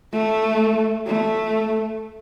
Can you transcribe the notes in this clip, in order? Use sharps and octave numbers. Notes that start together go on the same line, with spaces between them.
A3
A3